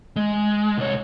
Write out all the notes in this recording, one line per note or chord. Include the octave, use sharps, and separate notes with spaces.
G#3
C2 C#5